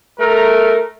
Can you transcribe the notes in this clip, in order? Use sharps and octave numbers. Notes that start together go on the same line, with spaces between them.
A3 A#4